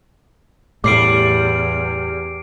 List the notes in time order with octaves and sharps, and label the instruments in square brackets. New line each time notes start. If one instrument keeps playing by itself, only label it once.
[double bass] E2 [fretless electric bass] A2 [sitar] G3 [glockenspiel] D6 C7 D7